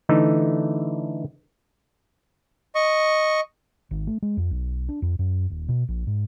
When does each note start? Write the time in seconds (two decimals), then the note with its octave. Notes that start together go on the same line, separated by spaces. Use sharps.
0.09 D3 E3 A3 D#4
2.75 D#5 C#6
3.91 G#1
4.07 A3
4.22 G#3
4.37 F2
4.51 B1
4.89 D4
5.02 F2
5.19 F#2
5.50 D#1
5.68 B2
5.88 A#1
6.07 G#2